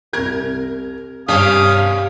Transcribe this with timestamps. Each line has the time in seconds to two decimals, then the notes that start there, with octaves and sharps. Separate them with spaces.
0.13 C2 A#4 G#6
1.28 G2 B2 C#4 G4 F5 D#6